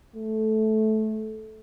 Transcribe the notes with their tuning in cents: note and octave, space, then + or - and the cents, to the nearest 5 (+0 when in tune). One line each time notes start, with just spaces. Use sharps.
A3 -15